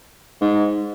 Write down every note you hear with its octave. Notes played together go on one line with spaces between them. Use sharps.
G#2